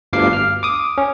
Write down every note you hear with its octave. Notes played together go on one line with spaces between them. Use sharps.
G1 D2 G2 F5 D6 C7
F6
D6 D#6
C#4